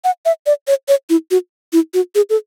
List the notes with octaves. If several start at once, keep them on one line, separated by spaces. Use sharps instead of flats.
F#5
E5
D5
C#5
C#5
E4
F#4
E4
F#4
G#4
A4